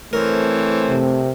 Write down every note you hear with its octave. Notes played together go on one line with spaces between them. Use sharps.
E3 A3 C4 A#4 C5 C#5
C3